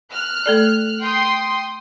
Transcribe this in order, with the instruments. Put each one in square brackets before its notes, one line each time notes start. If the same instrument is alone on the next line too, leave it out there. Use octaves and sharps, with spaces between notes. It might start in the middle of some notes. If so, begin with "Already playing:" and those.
[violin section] F6 F#6
[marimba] A3 A4 D5
[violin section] G5 C6 D#6